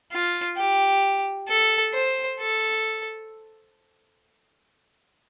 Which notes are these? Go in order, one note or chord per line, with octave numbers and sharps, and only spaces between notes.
F4
G4
A4
C5
A4